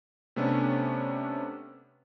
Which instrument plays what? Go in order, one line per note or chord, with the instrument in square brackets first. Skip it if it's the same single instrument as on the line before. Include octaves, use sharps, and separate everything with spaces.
[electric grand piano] C3 A3 B3 C#4 D4